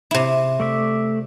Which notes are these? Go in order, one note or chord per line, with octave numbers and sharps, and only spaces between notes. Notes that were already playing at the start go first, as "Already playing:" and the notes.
C3 E4
A3 D5 E5